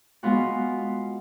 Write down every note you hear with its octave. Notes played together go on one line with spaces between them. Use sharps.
G#3 B3 F4 F#4